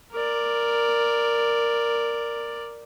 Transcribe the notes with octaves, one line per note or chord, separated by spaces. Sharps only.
A#4 D5